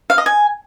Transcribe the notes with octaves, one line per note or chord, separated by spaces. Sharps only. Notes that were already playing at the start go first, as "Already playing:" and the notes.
F5
D#5
G#5